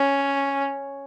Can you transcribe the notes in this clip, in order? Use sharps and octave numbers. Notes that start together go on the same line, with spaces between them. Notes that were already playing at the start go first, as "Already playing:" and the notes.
Already playing: C#4